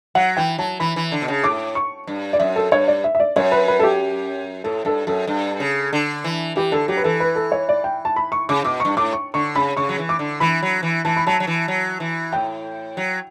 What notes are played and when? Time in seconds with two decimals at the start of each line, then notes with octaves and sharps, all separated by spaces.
0.15 F#3 F#5
0.37 E3 G5
0.58 F#3 A5
0.80 E3 B5
0.96 E3
1.12 D3
1.22 B2
1.28 C#3
1.44 A2 D6
1.75 C#6
2.07 G2
2.33 D5
2.39 F#2 E5
2.56 A4
2.71 G2 C#5
2.88 D5
3.04 E5
3.15 E5
3.20 D5
3.36 F#2 C#5
3.52 B4
3.68 B4
3.80 A4
3.83 G4
4.64 A2 A4
4.85 G2 A4
5.07 F#2 A4
5.27 G2
5.60 C#3
5.93 D3
6.24 E3
6.56 E3 G4
6.72 D3 A4
6.88 F#3 G4
6.97 B4
7.04 E3 A4
7.20 B4
7.36 A4
7.52 C#5
7.69 D5
7.84 G5
8.05 A5
8.16 B5
8.32 C#6
8.49 C#3 D6
8.64 B2 D6
8.80 G2 C#6
8.97 A2 D6
9.13 C#6
9.34 D3 C#6
9.55 C#3 B5
9.77 C#3 C#6
9.89 F#3
9.98 E3
10.09 D6
10.19 D3
10.40 E3 B5
10.63 F#3
10.83 E3
11.05 E3 A5
11.17 B5
11.27 F#3 A5
11.40 F#3
11.47 E3
11.68 F#3
12.00 E3
12.32 A2 G5
12.97 F#3